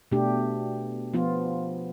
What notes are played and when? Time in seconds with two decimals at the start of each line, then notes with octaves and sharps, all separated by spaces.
0.11 B2 A3 D4 G4
1.14 F3 B3 F4